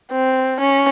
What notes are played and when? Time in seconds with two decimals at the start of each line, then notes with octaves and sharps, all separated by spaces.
0.12 C4
0.60 C#4